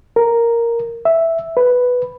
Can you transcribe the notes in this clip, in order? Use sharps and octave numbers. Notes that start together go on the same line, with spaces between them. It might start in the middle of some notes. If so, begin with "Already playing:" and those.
A#4
E5
B4